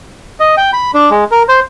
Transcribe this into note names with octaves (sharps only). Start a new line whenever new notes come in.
D#5
G5
B5
D4
G#3
A#4
C5